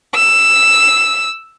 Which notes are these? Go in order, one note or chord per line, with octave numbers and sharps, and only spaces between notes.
E6